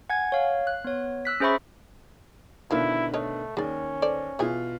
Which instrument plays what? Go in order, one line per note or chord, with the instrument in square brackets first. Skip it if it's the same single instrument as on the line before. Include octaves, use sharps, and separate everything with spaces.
[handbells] F#5 G#5 G#6
C#5 F5
F#6
B3 C#5
E6 F#6 B6
C#4 G#4 C5 E5 B5 C#6
[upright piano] B2 D3 D#3 [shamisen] F3 A#4 [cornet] E4
[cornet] A3 [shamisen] A#4 C#5 D#5
[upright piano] D#2 [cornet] C#4 [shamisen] G#4 D5
[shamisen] A4 C5 D5
[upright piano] B2 F4 [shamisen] E3 G#4 G#5